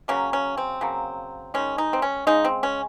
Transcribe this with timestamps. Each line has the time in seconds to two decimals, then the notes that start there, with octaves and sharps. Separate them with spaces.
0.08 C#3 F#3 A#3 C#4
0.33 C#4
0.57 C4
0.81 C#3 F#3 A#3
1.54 D#3 G#3 C#4
1.78 D#4
1.93 C4
2.02 C#4
2.27 C#3 G#3 D#4
2.45 C4
2.63 C#4